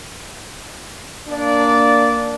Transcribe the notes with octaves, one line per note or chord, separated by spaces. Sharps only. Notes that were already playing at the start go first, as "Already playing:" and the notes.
A#3 D4 D5